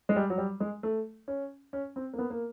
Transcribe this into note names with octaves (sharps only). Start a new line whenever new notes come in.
G#3
G3
F#3
G3
G#3
A3
C#4
C#4
C4
A#3
B3
A#3